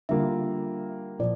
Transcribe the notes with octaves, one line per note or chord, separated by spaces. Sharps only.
D3 G3 A#3 F4 E5
A#2 F3 D5